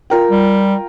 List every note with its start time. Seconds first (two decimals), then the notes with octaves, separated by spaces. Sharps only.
0.10 F4 A#4 G5
0.31 G3